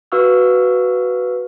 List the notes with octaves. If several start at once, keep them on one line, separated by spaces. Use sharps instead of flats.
F#4 B4 F5 C#6 E6 F6